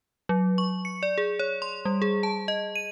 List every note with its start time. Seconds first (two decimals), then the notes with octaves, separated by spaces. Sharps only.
0.29 F#3
0.58 C#6
0.85 C#7
1.03 D5
1.18 G#4
1.39 C#5
1.62 C6
1.85 G3
2.02 G#4
2.23 A5
2.48 D#5
2.75 D#7